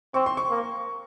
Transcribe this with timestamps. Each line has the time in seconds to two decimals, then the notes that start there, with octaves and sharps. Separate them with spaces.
0.14 C4 C#6
0.26 C6
0.37 C#6
0.50 A#3